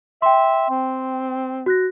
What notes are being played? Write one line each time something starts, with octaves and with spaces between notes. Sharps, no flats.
E5 G5 C6
C4
F#4 F#6 A#6